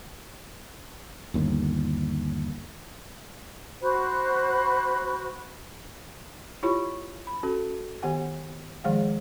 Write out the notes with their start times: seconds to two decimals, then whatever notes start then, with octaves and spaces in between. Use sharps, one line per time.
1.34 G1 D#2
3.82 F#4 C5 B5 F#6
6.63 E4 F4 G4 C#5 B5 C#6
7.27 B5
7.43 C#4 F#4 A4
8.02 D#3 B3 G4 F#5 G#5
8.84 D#3 F3 G#3 G#4 F5 F#5